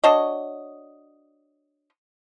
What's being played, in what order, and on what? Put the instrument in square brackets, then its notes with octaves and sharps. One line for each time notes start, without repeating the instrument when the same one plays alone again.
[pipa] D4 F#4 C#5 D#5